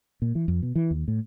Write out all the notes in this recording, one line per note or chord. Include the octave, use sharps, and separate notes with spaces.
A#2
E3
F2
B2
E3
D#2
A2